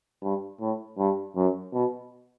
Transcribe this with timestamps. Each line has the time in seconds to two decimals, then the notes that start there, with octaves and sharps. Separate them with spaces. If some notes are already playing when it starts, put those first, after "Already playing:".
0.22 G2
0.60 A2
0.98 G2
1.36 F#2
1.73 B2